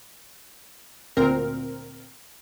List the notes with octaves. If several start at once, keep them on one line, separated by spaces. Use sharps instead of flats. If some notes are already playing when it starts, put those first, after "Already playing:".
D2 A#2 C4 A#4